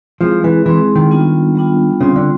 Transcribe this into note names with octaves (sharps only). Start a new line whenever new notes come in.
F3 G#3 C4 E4 G#4
E3
E3 G#3 C4 E4 G#4
D#3
G3 B3 D4 F4
G3 B3 D4 F4
C#3 G3 C4 F4
D3